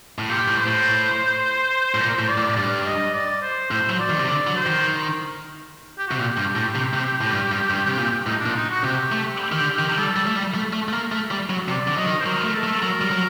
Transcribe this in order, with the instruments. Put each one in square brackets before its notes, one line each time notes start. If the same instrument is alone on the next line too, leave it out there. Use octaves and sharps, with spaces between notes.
[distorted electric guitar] A2
[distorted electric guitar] A#2 [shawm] G4
[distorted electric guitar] A2
[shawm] C5
[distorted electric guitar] A2
A2
[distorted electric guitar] A#2 [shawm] C5
[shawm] A#4
[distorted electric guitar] A2 [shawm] C5
[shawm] D5
[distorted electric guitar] A2
[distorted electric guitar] G2 [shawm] D5
[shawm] D#5
D5
C5
[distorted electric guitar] A2 [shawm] C5
[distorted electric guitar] F#3 [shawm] C5
[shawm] D5
[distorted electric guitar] D#3
C3
[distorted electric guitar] D3 [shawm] D5
[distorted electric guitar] F#3
[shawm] C5
[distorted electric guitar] D#3
[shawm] G4
[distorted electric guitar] C3 [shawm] F#4
[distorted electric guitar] A#2 [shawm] G4
[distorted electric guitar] G2
A2
C3
C3
A2
G2
G2
G2
C3
A#2
[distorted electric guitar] A2 [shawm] D#4
[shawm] D4
[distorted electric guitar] A#2
[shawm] D#4
F#4
[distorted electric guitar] C3 [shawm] G4
[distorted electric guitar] A3
D#3
D3
D#3
[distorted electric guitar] G3 [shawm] A4
[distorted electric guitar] G3
A3
G3
A3
A3
A3
A#3
A3
G3
F#3
[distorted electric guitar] C3 [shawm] D5
[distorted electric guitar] D3
[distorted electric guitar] F#3 [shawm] D#5
[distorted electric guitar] D#3
[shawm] C5
[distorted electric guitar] F#3 [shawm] A#4
[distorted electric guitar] A3
[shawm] A4
[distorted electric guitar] A3
[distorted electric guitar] F#3 [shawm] A#4
[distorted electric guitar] G3
F#3